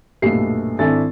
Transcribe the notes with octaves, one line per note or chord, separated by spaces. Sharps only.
B1 G2 A#2 A3 B3 C7
G#1 D4 E4 A4 G#5 A6